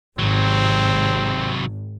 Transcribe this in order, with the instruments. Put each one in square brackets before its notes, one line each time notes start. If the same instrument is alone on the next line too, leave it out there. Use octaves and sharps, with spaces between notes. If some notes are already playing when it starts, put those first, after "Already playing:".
[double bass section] G#1 [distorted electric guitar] C3 F#3 [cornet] C4